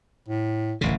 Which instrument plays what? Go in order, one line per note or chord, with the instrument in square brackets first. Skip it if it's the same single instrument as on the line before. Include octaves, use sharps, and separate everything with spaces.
[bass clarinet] A2
[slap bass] D1 A1 C#3